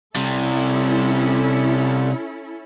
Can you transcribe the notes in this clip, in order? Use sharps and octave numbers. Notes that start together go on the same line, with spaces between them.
C3 G3 C#4 E4 A4